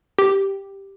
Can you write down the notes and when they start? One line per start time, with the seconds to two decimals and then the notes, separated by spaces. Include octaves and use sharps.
0.19 G4